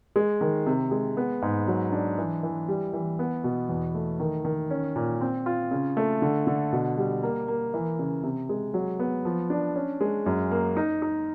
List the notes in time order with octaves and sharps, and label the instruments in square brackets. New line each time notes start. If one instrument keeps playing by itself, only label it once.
[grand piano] G#3
D#3
C3
G#3
B3
G#2
F#3
D4
E3
E3
G3
E3
B3
B2
E2
A3
D#3
D#3
C#4
A#2
C4
F4
C#3
A3
D3
D3
B2
G3
A#3
A#3
E3
C#3
C3
G#3
F#3
B3
F3
D4
C#4
G#3
F#2
A#3
D#4
D#4